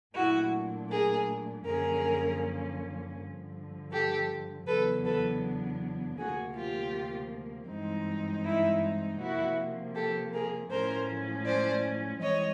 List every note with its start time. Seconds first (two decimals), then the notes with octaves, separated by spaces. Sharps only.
0.15 A#2 F#3 A3 D4 E4 F#4
0.91 G#4 A#4
1.65 F#2 D3 F3 A#3 C#4 G#4 A#4
3.17 G2 D3 F3
3.92 G4 A4
4.67 E2 C#3 F#3 B3 D4 A4 B4
5.05 A4 B4
6.18 D2 C3 F3 A#3 F#4 G#4
6.55 F4 G4
7.69 G2 E3 G#3 C4 D#4
8.45 E4
9.19 C3 F3 A#3 E4 F#4
9.95 G4 A4
10.33 G#4 A#4
10.70 A2 F3 A3 C#4 A#4 C5
11.46 C5 D5
12.21 G#2 E3 G3 C4 C#5 D#5